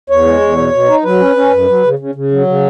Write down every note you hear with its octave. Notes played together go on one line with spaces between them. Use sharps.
E2 C#5
G#3
E2
B2
B2
D#4
F#3 B4
C#4
C#4
F#2
F#3
C#3
C#3
C#3
F#3
C#3